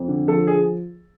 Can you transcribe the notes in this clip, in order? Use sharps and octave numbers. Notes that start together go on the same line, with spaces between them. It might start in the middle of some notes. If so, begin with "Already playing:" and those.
Already playing: F2
D3
F3 A4
G#4